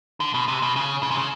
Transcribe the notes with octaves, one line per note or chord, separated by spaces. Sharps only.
D3
B2
C3
B2
C#3
C#3
C3
C#3